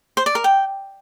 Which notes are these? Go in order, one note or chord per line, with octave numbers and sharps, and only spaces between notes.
C5
D5
A#4
G5